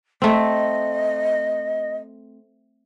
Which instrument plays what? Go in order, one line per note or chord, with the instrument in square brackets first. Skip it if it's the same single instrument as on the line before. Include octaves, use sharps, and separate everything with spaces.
[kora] A3 C4 [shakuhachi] D#5